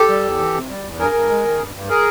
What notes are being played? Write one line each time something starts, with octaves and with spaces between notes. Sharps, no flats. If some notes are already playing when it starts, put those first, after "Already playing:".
Already playing: G4 A4
G3
E2
E3
C3
G3
E2
G2 G#4 A#4
G2
G#3
D#3
G2
G2
G#4 A#4